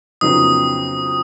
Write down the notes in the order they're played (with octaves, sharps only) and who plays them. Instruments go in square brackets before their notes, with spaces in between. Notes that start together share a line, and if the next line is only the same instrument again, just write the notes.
[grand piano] F2 C#3 F#3 B3 D#4 [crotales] D#6